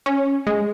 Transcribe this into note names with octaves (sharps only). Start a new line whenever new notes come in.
C#4
G#3